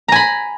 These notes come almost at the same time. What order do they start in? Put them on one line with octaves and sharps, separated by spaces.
A#5 G#5 B5